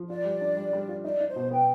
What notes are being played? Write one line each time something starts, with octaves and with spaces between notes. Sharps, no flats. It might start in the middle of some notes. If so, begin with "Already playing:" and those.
Already playing: F3
F4 D5
G3
D4
G3
G3
F4
D#4 D5
D#4
C5
B2
B3 G5